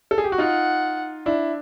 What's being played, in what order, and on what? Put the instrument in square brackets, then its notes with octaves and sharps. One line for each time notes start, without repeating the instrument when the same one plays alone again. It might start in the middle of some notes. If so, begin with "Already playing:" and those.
[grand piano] A4
G#4
G4
F#4
[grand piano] D#4 F4 [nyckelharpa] F#5
[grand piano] D4 E4